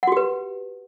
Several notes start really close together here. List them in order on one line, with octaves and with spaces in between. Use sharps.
F#5 F#4 G4 B4